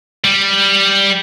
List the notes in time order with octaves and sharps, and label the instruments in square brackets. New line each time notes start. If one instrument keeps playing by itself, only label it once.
[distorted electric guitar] G3